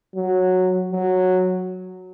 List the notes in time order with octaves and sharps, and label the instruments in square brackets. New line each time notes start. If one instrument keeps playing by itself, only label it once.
[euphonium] F#3
F#3